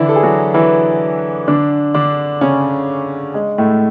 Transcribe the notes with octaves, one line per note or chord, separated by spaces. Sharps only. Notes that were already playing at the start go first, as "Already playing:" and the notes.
Already playing: D3 E3 D4 E4
A4
G#4
F#3 F#4
E3 E4
D3 D4
D3 D4
C#3 C#4
G#3
A2 A3